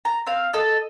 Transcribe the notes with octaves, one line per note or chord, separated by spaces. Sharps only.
A#5
C4 F5
A4 D#5